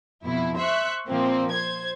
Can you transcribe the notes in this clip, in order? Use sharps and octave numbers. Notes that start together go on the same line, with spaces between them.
F2 B2 E4
C5 E5 C#6 F#6
A#2 F3 A#3 C4
C5 G#6